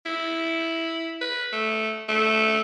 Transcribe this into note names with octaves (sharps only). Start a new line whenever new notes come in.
E4
B4
A3
A3